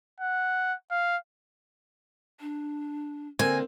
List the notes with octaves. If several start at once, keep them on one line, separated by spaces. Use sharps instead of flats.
F#5
F5
D4
D3 A#3 C4 G#5